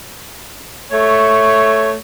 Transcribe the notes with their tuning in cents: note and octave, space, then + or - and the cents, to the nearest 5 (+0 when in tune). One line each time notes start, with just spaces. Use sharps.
A3 +0 C#5 +0